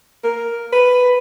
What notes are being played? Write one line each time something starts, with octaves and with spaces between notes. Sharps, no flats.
A#4
B4